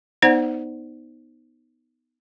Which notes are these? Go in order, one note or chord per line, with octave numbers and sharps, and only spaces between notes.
B3 D#4 C5 D5 F#5